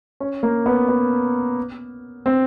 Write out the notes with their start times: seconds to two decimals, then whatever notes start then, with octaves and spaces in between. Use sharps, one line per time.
0.20 C#4
0.43 A#3
0.66 B3
0.88 B3
2.26 C4